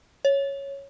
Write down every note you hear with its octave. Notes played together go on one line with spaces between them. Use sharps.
C#5